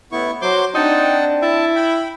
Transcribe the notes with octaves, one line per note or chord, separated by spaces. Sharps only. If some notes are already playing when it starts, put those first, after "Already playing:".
A1 B3 E4 C#6
F#3 C5 C6 D6
C4 D4 D#4 F#5 G5 A5
E4 A5
G5 B5